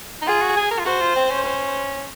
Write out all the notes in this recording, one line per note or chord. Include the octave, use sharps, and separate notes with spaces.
D#4
F4 G#4
F#4
G#4
A#4
F4
F#4 C5
F4
C4
C#4
C5